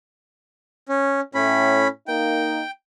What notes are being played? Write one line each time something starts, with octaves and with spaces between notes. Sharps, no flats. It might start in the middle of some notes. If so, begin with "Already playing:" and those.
C#4
A2 C#4 B5
A#3 D#4 G5